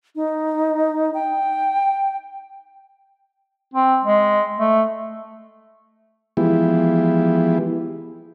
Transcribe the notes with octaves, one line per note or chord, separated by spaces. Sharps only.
D#4
G5
C4
G#3
A3
E3 F3 G#3 B3 E4 G4